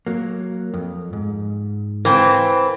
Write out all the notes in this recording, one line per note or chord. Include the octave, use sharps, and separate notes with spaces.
F#3 A#3
F2
G#2
E3 C4 A#4 F5 G#5